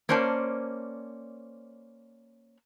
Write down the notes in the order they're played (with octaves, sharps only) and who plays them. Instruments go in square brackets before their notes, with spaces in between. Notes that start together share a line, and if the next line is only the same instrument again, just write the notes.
[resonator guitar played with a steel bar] A#3 C#4 C5 D5 A5